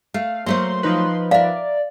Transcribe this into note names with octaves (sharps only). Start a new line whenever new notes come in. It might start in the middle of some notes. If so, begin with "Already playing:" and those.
A3 F5
F#3 A3 A#3 C5 C6
F3 D#4 B4
A#4 D5 E5 F5